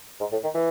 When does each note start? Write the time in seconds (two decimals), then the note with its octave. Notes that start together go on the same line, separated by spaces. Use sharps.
0.20 G#2
0.32 A2
0.44 D#3
0.54 E3